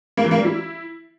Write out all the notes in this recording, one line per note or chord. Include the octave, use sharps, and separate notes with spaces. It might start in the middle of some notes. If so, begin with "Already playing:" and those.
A#3
E3
A#3
G3
E4